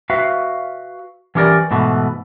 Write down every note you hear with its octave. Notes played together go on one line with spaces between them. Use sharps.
F#4 B4 E5 F5
E3 C#4 G4 A#4 D5
G#2 B2 E3 A3